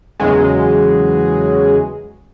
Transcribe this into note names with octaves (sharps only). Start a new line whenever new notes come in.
E2 C#3 F#3 G#3